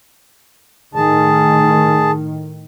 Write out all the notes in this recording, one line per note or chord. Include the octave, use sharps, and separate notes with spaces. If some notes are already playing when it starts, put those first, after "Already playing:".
A2 D#3 G#4 A5